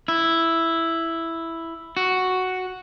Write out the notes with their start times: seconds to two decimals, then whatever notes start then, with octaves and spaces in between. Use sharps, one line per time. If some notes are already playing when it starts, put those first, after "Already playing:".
0.08 E4
1.97 F#4